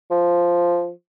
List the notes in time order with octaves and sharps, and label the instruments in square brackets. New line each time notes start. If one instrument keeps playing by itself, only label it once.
[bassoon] F3